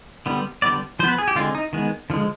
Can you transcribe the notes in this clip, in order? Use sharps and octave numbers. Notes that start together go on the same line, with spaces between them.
D3 G3 B3
D3 G3 B3 D5
F3 B3 B4 C5
G#4
G4
D3 G#3 C4 F4
D#4
D#3 G#3 B3
D3 F3 G#3